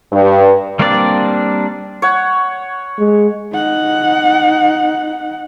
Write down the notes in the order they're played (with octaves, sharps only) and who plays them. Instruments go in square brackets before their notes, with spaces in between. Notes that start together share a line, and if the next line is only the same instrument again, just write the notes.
[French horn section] G2
[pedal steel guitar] G3 A#3 C4 D4 D5
[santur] C#5 F#5
[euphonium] G#3
[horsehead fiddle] D#4 F#5